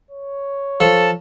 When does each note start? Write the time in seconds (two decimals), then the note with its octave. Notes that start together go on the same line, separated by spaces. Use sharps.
0.11 C#5
0.80 F3 A4 A5